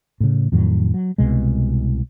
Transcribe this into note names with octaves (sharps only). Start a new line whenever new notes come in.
A2 C#3
F2 A2 D#3 F#3
F#3
C2 B2 G#3